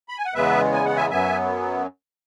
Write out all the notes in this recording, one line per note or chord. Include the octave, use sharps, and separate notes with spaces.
B5
G#5
F#5
E2 C#3 G#3 B3 B4 E5
G#5
F#5
E5 G#5
F#2 F#3 B3 E5 G#5